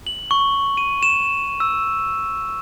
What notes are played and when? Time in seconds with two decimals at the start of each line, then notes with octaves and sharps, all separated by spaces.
0.07 F#7
0.31 C#6
0.77 D#7
1.03 E7
1.60 E6